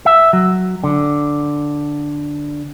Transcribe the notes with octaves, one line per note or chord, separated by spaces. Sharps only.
E5
F#3
D3